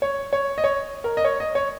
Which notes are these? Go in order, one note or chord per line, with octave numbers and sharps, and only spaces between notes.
C#5
C#5
D#5
C#5
A#4
D#5
C#5
D#5
C#5